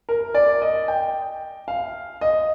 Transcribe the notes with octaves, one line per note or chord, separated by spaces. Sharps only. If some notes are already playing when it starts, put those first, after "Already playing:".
A#4
D5
D#5
G5
F5
D#5